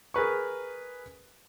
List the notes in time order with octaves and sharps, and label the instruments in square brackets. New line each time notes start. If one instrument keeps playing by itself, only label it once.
[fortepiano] G#4 A#4 B4 C#6